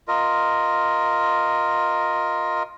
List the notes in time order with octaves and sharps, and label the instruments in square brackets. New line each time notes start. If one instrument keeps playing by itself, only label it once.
[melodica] F4 A#4 D#5